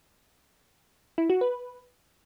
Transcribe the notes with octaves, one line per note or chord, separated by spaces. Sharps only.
E4
F#4
B4